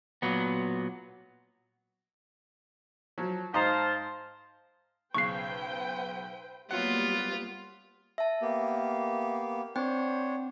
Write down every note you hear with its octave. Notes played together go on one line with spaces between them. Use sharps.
A#2 F#3 B3
F3 F#3
G#2 C5 D#5 F5 A5 A#5
B1 C#3 B4 C5 G5 C#6 F#6 C7
F#3 G3 A#3 B3 F4 F#5
E5 A5
A#3 B3 G4
C4 D4 C5 C#5 G5